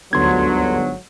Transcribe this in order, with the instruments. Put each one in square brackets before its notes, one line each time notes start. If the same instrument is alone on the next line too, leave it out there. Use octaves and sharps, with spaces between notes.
[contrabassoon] G1 [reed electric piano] D2 C6 G#6 [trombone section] G#2 D3 F#3